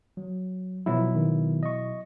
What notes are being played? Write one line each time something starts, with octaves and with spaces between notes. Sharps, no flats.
F#3
B2 F3 F#3 E4
D#3 B3
D#5 C#6